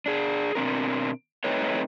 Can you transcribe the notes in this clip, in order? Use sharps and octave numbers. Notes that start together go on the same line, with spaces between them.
D4 G#4
B2 C4 D4 A#4
A3 C4 D#4 B4 C#5